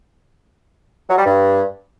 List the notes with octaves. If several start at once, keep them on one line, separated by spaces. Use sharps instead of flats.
F#3
G3
G2